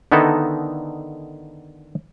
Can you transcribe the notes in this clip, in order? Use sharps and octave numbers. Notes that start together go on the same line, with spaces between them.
D3 D#3 B3 D#4 E4 A4